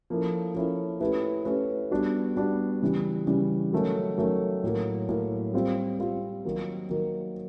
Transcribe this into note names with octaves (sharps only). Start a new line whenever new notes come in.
F3 A#3 C#4 E4 A4
F3 A#3 C#4 E4 A4
A3 C#4 E4 G4 B4
A3 C#4 E4 G4 B4
G3 B3 D4 F#4
G3 B3 D4 F#4
C#3 E3 G3
C#3 E3 G3
D#3 F#3 A3 C#4
D#3 F#3 A3 C#4
A2 F#3 A#3
A2 F#3 A#3
G3 C4 F4
G3 C4 F4
D#3 F#3 A#3
D#3 F#3 A#3